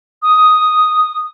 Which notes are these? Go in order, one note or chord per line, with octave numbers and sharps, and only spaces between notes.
D#6